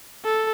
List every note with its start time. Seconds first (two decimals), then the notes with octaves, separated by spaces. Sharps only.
0.25 A4